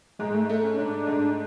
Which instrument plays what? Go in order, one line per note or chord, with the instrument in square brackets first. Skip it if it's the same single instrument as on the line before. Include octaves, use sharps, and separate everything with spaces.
[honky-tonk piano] G#2 [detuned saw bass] G#3
[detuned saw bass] A3
[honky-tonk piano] A3
[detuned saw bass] C#4
[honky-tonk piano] G#2 [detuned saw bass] D4
[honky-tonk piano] G#2